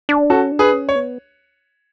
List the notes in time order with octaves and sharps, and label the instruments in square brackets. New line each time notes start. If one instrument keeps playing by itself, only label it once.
[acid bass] D4
[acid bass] C#4 [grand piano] F#4 A4
[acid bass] D4
[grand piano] G#4 B4
[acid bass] C#4
[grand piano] C#5
[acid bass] B3